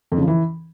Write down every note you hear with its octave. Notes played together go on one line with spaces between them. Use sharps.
F2
C#3
F3
E3